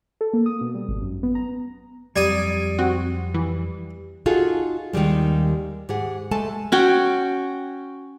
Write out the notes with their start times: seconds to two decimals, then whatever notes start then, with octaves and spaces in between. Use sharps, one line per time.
0.21 A4
0.33 A#3
0.46 D#6
0.61 B2
0.75 G3
0.89 G#1
1.01 F#2
1.23 B3
1.35 A#5
2.16 F2 F#3 G3 D5 D#6 G#6
2.78 C4 F#4
3.34 E3
4.26 D#4 F4 F#4 G#4 A4
4.93 D#2 D#3 F3 G3 G#3
5.89 G#2 G4 G#4 F#5
6.31 G#3 A3 A4 G#5 A5
6.72 C#4 F#4 G5